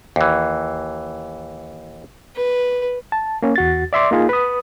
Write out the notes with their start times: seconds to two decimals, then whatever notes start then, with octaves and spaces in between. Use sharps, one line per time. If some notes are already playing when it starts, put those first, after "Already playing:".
0.16 D#2 E3
2.36 B4
3.12 A5
3.43 A#3 C#4
3.56 E2 F#4 A6
3.93 D5 E5 C6 D6
4.11 A#3 D#4 F4 G#4
4.29 B4 D#6